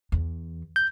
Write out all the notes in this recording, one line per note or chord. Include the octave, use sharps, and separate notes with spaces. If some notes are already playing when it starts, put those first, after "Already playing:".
E2
G6